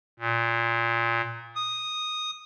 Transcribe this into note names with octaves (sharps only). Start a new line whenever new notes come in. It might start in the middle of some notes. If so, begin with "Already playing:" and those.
A#2
D#6